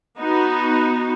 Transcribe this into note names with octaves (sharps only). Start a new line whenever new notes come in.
B3 D#4 F#4